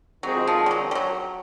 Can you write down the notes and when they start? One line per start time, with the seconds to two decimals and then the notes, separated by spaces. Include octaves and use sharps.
0.23 D#3 F#3 G#3 C4 F4 G#4
0.47 F3
0.66 G3
0.71 F#3
0.91 G3
0.95 F#3